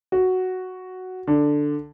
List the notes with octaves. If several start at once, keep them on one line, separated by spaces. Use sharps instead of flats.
F#4
D3